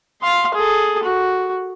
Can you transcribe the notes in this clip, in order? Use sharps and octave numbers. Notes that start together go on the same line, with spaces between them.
F5 C6
G#4 A4
F#4